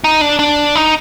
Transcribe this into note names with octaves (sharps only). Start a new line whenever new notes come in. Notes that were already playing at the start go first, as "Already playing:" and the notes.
D#4
D4
D4
D#4